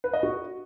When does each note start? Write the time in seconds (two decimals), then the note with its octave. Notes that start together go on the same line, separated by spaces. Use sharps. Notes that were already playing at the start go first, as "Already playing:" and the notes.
0.04 B4
0.13 D#5
0.23 F#4